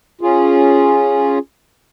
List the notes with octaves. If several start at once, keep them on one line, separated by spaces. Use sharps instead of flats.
C#4 F4 G#4